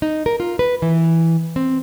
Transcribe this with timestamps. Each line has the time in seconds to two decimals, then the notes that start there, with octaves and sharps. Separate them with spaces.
0.02 D#4
0.26 A#4
0.40 F4
0.59 B4
0.82 E3
1.56 C4